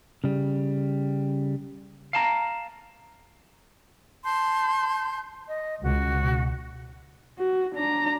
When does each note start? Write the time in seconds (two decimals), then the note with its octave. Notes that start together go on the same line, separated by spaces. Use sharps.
0.24 C#3 G3
2.13 F5 A5 A#5
4.24 A5 C6 G6
5.49 D#5
5.83 C#2 F#4
6.22 B2
7.38 F#4
7.75 D4 A#5